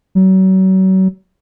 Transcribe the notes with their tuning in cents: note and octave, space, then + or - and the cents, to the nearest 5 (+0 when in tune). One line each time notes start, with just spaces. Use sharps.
F#3 +35